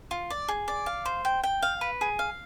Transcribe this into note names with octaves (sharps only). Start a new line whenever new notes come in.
F4
D5
G#4
D5
F5
C5
G5
G5
F5
B4
G#4
F5